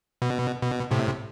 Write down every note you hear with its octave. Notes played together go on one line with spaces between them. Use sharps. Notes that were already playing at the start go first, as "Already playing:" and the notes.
B2
B2
A2 C3